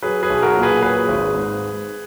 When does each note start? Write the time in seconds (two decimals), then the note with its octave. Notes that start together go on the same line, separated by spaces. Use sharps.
0.02 F#3 G#4 B4
0.23 G#4 B4
0.30 B1
0.42 F#4 A#4
0.57 A#2
0.63 G#4 B4
0.82 F#3 G#4 B4
1.09 G#1
1.35 G#2